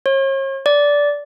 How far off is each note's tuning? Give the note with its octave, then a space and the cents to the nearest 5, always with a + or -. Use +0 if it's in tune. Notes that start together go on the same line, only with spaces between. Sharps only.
C#5 -40
D5 -15